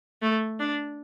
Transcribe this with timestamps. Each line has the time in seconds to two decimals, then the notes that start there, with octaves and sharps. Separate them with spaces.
0.22 A3
0.59 D4